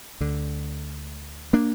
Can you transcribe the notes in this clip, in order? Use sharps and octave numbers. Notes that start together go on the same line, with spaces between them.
D2 D3
A#3 D4